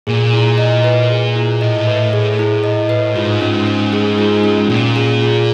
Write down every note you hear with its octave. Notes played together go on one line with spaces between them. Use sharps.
A#2 G#4
E4
D#5
B4
G#4
E4
A2 D#5
B4
G#4
E4
D#5
B4
G#2 F4
C#4
C#4
G#4
F4
C#4
A#2 C#4
G#4
F4